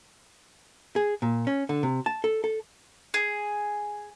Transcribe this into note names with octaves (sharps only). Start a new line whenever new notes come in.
G#4
A#2
C#4
D3
C3
A5
A4
A4
G#4